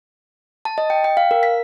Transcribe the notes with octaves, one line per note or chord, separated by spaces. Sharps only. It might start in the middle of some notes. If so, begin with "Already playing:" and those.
A5
D#5
G5
G5
F5
A#4
B6